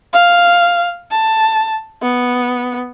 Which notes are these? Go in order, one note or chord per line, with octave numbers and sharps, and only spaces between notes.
F5
A5
B3